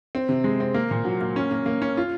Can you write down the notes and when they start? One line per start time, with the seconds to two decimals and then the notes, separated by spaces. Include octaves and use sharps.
0.15 C4
0.29 C3
0.44 G#3
0.60 C4
0.74 A#3
0.91 A#2
1.05 F#3
1.21 A#3
1.36 C#4
1.51 A#3
1.66 A#3
1.82 C#4
1.97 F4